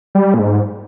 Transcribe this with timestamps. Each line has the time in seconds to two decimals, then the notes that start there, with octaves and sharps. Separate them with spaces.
0.15 G3
0.34 A#2
0.39 G#2